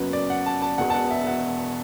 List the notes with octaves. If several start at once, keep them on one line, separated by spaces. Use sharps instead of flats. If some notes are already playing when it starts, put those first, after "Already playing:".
Already playing: F#1 F#2 F#3 B3 B4
D5
F#5
A5
A5
E1 E2 B2 B3 F#5
A5
F#5
E5
F#5